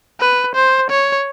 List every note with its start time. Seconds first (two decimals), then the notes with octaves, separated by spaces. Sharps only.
0.21 B4
0.55 C5
0.90 C#5